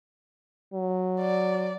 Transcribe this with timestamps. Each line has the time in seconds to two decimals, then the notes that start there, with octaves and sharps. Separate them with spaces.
0.74 F#3
1.20 D5